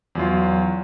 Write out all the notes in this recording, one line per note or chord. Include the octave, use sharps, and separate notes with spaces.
E2 F#3 F4